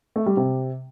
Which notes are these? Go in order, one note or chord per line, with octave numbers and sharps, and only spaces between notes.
A3
G3
C3